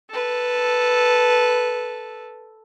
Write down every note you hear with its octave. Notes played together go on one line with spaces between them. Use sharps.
A4 B4